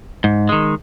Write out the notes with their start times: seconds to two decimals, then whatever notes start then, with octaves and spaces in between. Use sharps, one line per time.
0.24 G#2
0.49 D#3 G#3